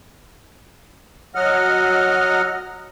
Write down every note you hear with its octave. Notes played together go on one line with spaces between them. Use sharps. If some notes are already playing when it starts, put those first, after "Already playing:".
F#3 D#5 F#5 F6